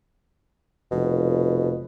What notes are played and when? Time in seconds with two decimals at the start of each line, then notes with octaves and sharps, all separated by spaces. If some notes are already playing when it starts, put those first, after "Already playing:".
0.91 F1 B2